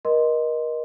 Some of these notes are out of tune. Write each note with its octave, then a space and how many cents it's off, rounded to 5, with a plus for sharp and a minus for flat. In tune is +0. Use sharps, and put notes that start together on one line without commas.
A#4 +35 D#5 -5 C6 +0